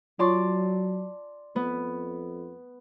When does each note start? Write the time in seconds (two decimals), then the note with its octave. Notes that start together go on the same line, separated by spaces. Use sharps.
0.19 F#3 F4 C#5 D5 A5 C6 C#6
1.56 F2 B3